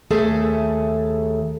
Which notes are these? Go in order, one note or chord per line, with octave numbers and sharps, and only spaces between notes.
D#2 A3 G#4 A4 E5